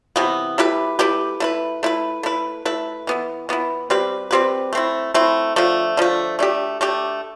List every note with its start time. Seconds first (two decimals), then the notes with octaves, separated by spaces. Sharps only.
0.16 C3 E3 B3
0.58 A3 E4 G4 B4
0.99 A3 E4 G4 B4
1.40 A3 E4 B4
1.83 A3 E4 B4
2.23 A3 E4 B4
2.65 A3 E4 B4
3.07 E3 B3 E4
3.49 E3 B3 E4
3.90 G3 C4 G4 B4
4.31 G3 C4 G4 B4
4.73 A3 C4 E4
5.14 A3 C4 E4
5.56 D3 F3 A3
5.97 D3 F3 A3
6.39 A3 D4 G4
6.81 A3 D4 G4